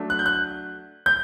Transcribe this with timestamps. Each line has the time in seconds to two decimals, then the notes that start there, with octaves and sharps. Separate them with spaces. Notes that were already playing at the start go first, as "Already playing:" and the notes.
Already playing: F#3 A3 D4
0.10 F#6
0.19 G6
0.26 F#6
1.06 G6